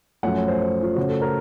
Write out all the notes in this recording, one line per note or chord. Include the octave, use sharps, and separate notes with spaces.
F#2 F3 A3 C#4 F#5
C#5
C5
C5
F4
C#3 A3 C#4 F#4
A4
A#4